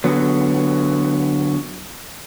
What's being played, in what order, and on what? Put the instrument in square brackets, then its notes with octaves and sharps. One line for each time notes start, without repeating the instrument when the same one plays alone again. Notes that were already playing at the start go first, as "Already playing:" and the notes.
[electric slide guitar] D3 F#3 B3